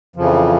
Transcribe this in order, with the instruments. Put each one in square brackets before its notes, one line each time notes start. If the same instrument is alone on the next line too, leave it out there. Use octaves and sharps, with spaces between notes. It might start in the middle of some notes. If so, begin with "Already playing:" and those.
[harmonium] F2 C#3 E3 F3